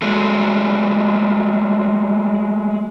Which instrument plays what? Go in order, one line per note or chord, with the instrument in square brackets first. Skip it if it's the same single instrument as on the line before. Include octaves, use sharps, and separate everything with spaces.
[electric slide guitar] F#3 G#3 A3